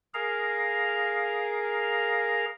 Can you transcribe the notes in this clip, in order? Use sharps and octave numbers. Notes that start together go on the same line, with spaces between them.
G#4 A#4 F5 A#5